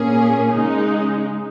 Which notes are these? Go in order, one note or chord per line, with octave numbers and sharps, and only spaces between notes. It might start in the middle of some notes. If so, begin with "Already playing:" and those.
Already playing: A#2 A#3 C#4 G#4
C#3 G#3 D#4